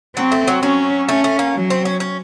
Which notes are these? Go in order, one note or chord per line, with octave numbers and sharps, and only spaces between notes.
F#3 C4
A3
F#3
F#3 C#4
A3 C#4
A3
A#3
F#3
C4
C#4
C#4